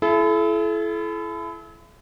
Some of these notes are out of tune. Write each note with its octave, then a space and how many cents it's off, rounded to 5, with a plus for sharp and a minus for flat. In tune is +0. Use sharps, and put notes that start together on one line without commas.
E4 +30 A4 -40